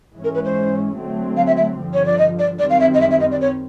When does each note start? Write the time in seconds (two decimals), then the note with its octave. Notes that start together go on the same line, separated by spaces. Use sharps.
0.13 G#2 E3 G#3 C#4
0.24 A#4
0.34 B4
0.44 C5
0.96 D3 F#3 A3 C4
1.36 F5
1.47 E5
1.57 E5
1.77 G2 D3 F3
1.93 C#5
2.05 D5
2.18 D#5
2.39 D5
2.59 F#2 D#3 G3 C4 D5
2.70 F5
2.80 E5
2.94 D#5
3.00 E5
3.11 E5
3.20 D#5
3.31 D5
3.41 C#5